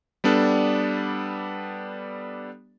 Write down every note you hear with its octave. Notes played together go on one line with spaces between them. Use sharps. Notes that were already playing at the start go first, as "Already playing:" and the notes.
G3 B3 D4 A4 D5